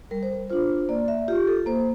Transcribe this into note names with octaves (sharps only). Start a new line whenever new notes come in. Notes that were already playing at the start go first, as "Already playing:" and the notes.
G3 A#4
C5
A#4
D4 F4 C5
A#3 D5
E5
F4 G4
A4
A#3 C5